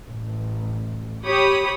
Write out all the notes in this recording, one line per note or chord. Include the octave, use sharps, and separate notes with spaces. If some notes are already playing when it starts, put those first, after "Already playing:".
A1
G4 C#5 B5 D#6